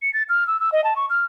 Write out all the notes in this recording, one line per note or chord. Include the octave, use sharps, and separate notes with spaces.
C#7
A6
F6
E6
E6
D#5
A5
C#6
F6